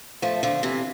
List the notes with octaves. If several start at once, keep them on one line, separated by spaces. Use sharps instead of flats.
F3 A3
D3 F3
C3 E3